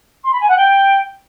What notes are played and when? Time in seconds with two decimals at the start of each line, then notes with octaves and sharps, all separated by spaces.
0.23 C6
0.32 B5
0.40 G#5
0.48 F#5
0.56 G5